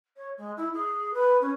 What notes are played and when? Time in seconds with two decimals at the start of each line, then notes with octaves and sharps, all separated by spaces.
0.16 C#5
0.37 G#3
0.57 E4
0.73 G#4
1.13 B4
1.41 C#4